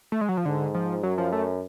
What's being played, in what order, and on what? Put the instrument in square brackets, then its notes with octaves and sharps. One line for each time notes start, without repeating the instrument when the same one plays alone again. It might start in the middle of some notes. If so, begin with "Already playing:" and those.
[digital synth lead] A3
G#3
F#3
F3
[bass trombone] G#2 [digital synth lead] D3
[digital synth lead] F3
[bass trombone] F#2 [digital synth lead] F#3
[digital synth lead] F3
A3